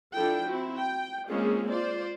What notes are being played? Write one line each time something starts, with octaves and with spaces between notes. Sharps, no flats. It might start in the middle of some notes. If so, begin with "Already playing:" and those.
F3 D4 E4 A4 G5
C4 E4 F#4
G5
G#3 A#3 C4 C#4 F4 G#4
F4 C5 D5